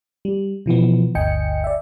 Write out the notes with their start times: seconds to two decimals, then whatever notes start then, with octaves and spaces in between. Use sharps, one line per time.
0.25 G3
0.66 B2 E3 F3 B3
1.15 G1 D2 D#5 G5 G#5 C#7
1.64 D5 E5